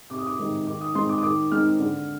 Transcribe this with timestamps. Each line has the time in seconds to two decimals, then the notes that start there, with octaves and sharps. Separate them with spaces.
0.10 C3 D6
0.18 D#6
0.26 D6
0.39 D#3 G#3 D#4
0.67 D#3 D6
0.81 D#6
0.95 G#3 C4 D#4 C6
1.09 D6
1.18 D#6
1.23 D#3 D6
1.51 G#3 C4 D#4 F6
1.80 D3